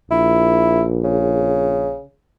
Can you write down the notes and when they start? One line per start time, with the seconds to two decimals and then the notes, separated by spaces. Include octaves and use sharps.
0.11 A#1 E4
1.04 C#3